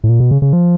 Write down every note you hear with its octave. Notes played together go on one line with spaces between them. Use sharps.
A2
A#2
B2
C#3
C#3
F3